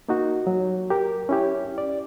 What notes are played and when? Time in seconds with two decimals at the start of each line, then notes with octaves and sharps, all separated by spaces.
0.09 A#3 D#4 F#4
0.47 F#3
0.90 G4 A#4
1.29 C#4 E4 G4
1.78 D5